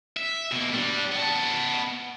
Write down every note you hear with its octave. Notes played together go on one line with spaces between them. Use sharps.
E5
B2 A#3
G3 D4
B3 A5